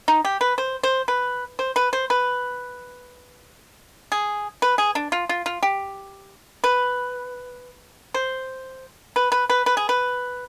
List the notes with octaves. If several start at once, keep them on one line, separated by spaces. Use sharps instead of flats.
D#4
G4
B4
C5
C5
B4
C5
B4
C5
B4
G#4
B4
G#4
D4
F4
F4
F4
G4
B4
C5
B4
B4
B4
B4
G#4
B4